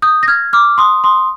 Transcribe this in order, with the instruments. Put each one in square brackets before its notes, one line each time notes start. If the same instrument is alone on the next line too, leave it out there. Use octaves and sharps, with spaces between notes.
[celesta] D#6 G6
A#6
F6 G#6
D6 F6
C6 D#6
C6 D#6